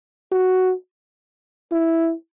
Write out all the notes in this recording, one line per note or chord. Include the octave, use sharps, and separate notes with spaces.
F#4
E4